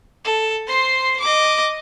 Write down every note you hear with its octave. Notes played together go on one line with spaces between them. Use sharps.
A4
C5 C6
D#5 D6